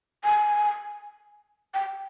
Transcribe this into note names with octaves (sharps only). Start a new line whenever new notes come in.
G#5
G5